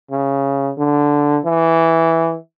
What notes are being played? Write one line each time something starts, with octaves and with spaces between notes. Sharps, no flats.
C#3
D3
E3